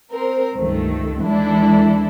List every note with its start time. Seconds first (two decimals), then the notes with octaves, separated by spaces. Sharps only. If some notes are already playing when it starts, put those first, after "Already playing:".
0.12 C4 A#4 C5
0.55 C#2 G2 D#3 A3
1.24 D#2 E3 G#3 D4 E4 A4